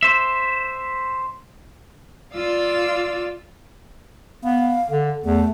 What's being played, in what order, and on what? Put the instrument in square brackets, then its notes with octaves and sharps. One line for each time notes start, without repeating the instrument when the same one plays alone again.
[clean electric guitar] C5 E5
[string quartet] F4 D5 F5 E6
[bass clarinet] B3 [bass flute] F5
[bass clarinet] D3
[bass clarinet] E2 [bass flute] A3